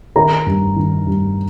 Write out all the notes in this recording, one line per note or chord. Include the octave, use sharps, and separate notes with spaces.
D#3 A#4 A#5
G2
D#3
G2